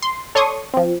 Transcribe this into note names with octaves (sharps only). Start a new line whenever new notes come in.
C6
A4 C#5 D5 C6 C#6 D#6
F3 C4